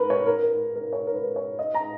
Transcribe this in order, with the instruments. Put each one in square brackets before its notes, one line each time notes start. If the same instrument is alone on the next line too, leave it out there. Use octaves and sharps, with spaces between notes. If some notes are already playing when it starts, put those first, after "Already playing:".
Already playing: [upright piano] A#4 B4
C#5
A#4
A#4
A#4
C#5
A#4
B4
C#5
D#5
A#5